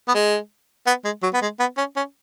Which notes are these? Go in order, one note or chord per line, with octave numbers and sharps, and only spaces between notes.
B3
G#3
B3
G#3
F#3
B3
G#3
B3
C#4
C#4